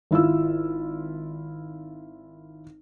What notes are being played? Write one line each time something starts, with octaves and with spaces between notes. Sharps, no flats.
G#1 E4 F4 E6